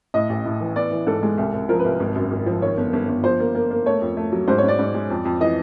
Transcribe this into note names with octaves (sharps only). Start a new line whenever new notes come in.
A2 D#5
A1
A2
E3
B3 D5
E3
G#2 A4
G#3
C2
C2
F3 A#4
B4
C2
G#1
F#2
G#1
F3
D#3 C#5
G1
G1
G1
F3 C5
A#3
A#3
A#3
A3 C#5
F2
A3
F#3
G#2 C5
C#5
G#2 D5
G#2
G#3
F2
F2
E3 D#5